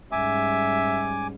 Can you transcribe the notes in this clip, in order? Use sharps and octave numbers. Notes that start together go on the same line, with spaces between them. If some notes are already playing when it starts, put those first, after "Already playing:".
G#2 G3 C#4 E5 G#5 D6